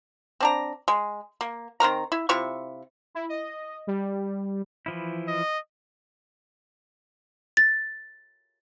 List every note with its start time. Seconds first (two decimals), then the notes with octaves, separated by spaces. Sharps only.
0.40 C4 D4 A#5
0.88 G#3
1.41 A#3
1.80 D#3 C4 A#4 A#5
2.12 E4
2.29 C3 E4 F4 C#6
3.15 E4
3.29 D#5
3.87 G3
4.86 E3 F3 E4
5.28 D#5
7.57 A6